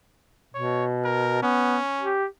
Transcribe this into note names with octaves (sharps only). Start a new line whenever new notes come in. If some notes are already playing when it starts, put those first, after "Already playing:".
B2 C#5
A#4
B3 C#4
G4